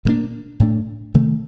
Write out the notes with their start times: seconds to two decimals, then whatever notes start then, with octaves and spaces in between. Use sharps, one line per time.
0.05 A#2 G3 A#3 D4
0.60 A2 A3 D4
1.14 C3 D#3 A3